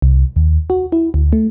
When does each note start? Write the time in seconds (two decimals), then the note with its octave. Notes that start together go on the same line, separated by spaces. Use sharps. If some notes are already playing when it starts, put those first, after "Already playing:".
0.02 C2
0.36 D#2
0.70 F#4
0.92 E4
1.14 D2
1.33 A3